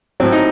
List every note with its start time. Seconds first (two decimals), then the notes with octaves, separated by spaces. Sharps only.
0.20 A2 F#3 C4
0.32 D#4